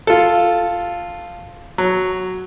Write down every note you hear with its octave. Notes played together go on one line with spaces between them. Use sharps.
F4 A4
F#3